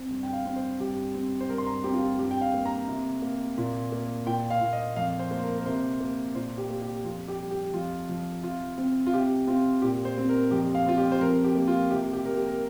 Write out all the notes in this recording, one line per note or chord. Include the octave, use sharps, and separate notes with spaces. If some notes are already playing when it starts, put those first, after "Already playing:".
Already playing: C4
G2
G5
F5
C4
C5
G2 G4
C4
C5
G2 A#4
C6
A#5
C4 G4
F4
G4
G2 G4
G5
F5
A#3
A#5
C3
A#3
A#2
A#3
A#2 G5
F5
A#2
D#5
F2 F5
C5
A#3 C5
A#4
A#4
C3 C5
A#3
A#2 C5
G4
A#3
G4
F2 F4
G4
G3
G4
F2 F4
F3
C3 F4
C4
F4
C3 G4
C4 F4
A#2 G4
C5
C4
A#4
F2 G4
F5
C4 F4
G4
C5
F2 A#4
G4
A#3
F4
C3 G4
G4
A#3 A#4
G4
A#4